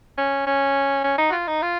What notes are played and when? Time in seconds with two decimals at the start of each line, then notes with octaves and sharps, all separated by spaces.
0.18 C#4
0.47 C#4
1.04 C#4
1.18 D#4
1.30 F#4
1.33 F4
1.47 D#4
1.62 F4